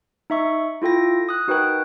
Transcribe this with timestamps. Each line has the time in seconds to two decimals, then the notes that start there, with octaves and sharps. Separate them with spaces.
0.30 D#4 E5 C#6
0.82 E4 F4 A4 G5 A#6
1.29 D#6 F#6
1.47 D#4 F#4 A#4 B4 G5 F#6